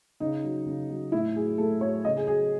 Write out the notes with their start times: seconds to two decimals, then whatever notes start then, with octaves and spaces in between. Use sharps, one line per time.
0.20 C#3 D#4
0.44 F#3
0.66 C#3
0.90 F#3
1.12 A2 E4
1.36 F#3 G#4
1.58 A2 A4
1.81 F#3 C#5
2.05 C#3 D#5
2.17 G#4
2.27 F#3 G#4